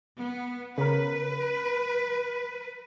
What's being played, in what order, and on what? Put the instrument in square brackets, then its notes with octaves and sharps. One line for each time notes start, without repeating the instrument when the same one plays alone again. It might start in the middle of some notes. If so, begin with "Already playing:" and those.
[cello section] B3
[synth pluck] C#3 A#4 [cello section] B4